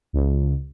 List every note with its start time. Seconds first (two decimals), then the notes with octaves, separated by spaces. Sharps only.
0.13 C#2